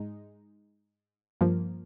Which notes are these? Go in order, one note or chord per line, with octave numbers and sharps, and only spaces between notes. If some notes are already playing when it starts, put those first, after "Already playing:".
Already playing: G#2 G#3 D#4
G2 F3 A#3